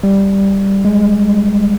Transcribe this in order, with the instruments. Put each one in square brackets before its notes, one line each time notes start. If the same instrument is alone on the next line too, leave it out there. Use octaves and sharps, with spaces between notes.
[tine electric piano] G3
G#3